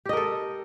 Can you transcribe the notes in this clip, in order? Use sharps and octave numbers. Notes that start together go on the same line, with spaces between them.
G4 A4 A#4 D#5